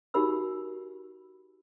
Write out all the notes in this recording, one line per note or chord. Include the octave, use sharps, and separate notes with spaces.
D#4 F#4 G4 A#4 B5 E6